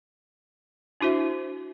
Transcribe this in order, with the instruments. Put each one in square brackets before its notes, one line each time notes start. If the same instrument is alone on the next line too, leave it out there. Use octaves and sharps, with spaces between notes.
[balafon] D4 E4 F#4 C5 E5